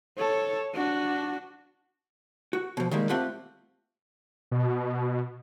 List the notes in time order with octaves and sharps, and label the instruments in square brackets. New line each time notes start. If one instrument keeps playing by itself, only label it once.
[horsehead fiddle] A4 C#5
D4 F#4
[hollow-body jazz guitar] F#4
B2 F3
D#3 G3 G#3 A#3
A3 C4 F4 G4 F#5
[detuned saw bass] B2